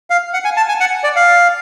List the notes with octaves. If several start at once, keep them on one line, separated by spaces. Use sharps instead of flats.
F5
F#5
G#5
A5
G#5
F#5
D5
F5